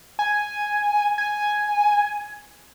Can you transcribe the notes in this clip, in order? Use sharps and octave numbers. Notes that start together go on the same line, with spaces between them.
G#5
G#5